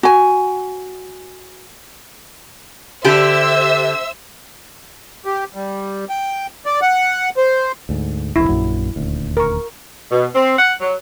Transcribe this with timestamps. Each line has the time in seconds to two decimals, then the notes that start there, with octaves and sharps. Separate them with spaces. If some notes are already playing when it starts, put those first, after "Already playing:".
0.03 F#4 G#5
3.04 D3 G4 C5 E5 E6
5.25 G4
5.55 G3
6.09 G5
6.66 D5
6.82 F#5
7.37 C5
7.89 D2 G#2
8.36 E1 C2 F2 E4
8.49 A#1 F#2 F#3
8.96 D#1 D2
9.37 A#4 C#6
10.12 B2
10.35 C4
10.59 F#5
10.81 F#3